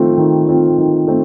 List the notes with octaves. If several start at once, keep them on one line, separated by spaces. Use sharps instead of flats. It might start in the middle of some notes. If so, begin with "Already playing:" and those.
Already playing: D#3 A3 C4 F4
D#3
A3 C4 F4
D#3
A3 C4